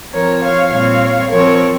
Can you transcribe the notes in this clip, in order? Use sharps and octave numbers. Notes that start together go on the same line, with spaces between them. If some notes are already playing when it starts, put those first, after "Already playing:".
F3 C4 A#4 C#5
C#5 F5
A#2 G3 C4 C#5 F5
F3 C4 A#4 C#5